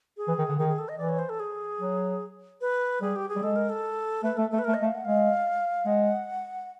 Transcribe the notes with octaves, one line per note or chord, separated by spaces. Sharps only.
G#4
E3
D#3
D3
D#3 G#4
G#4
A4
D#5
E3 D5
C#5
C5
A4
G#4
F#3
B4
G3 G#4
G4
G#4
G3
G#3 A4
A#4
A4
A3 B4
A3 A4
A3 A4
B4
A3 A#4
D#5
A3
F5
F#5
G#3 F5
G#3 F#5